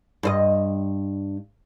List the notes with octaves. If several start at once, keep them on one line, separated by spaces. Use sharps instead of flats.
G2 C5 D#5